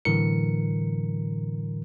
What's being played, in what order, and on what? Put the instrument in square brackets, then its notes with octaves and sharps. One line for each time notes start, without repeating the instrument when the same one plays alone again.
[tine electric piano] A2 D3 E3 F#3 A#4 C#7